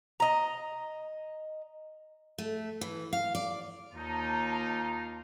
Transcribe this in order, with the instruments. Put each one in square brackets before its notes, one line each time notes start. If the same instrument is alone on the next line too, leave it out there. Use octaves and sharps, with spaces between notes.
[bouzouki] D#5 A#5
[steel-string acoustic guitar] A3
E3
F5
D5
[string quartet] D#2 F4 [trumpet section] D#4 [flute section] A5 A#5